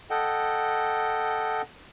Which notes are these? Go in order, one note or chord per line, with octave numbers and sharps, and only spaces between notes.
A4 D#5 F#5 G5